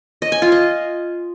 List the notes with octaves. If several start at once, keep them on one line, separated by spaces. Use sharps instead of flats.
D#5
G#5
F4
D#5